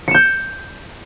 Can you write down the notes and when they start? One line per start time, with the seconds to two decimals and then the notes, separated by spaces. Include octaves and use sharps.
0.08 C#7
0.11 E7
0.14 G6